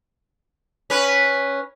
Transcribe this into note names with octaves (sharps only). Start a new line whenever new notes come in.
C#4 B4